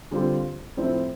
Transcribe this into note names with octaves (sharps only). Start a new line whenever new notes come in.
D3 G3 C4 F4
A2 F3 C4 E4